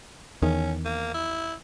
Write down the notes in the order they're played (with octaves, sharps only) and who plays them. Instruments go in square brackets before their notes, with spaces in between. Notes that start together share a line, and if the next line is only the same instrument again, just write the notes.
[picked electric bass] E2 D#3 [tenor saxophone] C#4
[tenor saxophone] A#3
E4